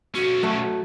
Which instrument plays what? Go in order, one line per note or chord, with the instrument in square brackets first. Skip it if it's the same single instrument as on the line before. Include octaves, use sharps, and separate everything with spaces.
[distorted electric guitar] B1 C#4 [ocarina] F#4
[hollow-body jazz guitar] F#3 A3 A4